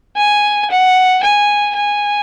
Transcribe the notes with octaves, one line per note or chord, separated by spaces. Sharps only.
G#5
F#5
G#5
G#5